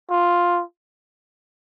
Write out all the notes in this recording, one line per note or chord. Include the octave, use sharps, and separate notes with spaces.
F4